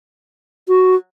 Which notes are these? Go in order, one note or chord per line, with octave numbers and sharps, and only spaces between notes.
F#4